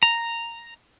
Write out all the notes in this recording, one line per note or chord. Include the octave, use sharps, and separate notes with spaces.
A#5